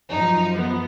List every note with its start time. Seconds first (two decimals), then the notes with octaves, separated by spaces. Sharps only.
0.10 F#2 F3 D#4
0.55 B3